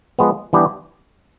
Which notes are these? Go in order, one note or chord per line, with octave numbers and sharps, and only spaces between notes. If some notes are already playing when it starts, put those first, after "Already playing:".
F3 G#3 B3
E3 G3 B3 D4 G4